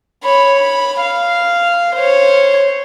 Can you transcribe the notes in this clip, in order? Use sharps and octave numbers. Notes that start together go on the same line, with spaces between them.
C#5 B5
B5
F5
C5 C#5